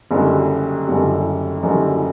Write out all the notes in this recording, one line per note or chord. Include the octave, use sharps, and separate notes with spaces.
F#1 F#2 D3 G3
F#1 F#2 D3 G3
F#1 F#2 D3 G3